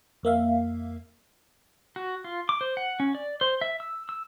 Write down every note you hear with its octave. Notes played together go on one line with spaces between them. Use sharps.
F2 A#3 E5 F5
F#4
F4
D6
C5
F#5
C#4
D5
C5
E5
E6
E6